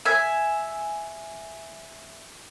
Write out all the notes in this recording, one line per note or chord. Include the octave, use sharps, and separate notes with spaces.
E5 G#5